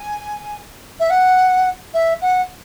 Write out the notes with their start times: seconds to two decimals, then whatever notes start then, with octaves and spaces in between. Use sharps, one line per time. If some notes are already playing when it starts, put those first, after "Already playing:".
Already playing: G#5
0.99 E5
1.10 F#5
1.94 E5
2.21 F#5